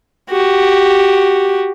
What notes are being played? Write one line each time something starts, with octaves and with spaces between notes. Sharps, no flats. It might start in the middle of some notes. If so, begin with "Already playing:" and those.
F#4 G4